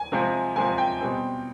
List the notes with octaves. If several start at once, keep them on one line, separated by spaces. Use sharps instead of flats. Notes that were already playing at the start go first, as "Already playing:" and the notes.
Already playing: G#5
C3 F3 G#3 C4
C3 F3 G#3 C4 G#5
G5
B2 G3 C4